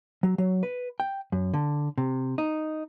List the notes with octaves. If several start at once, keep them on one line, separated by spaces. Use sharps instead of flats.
F#3
F#3
B4
G5
F#2
D3
C3
D#4